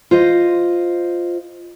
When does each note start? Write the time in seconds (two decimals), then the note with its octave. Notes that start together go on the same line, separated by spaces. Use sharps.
0.11 F4 C5 D#5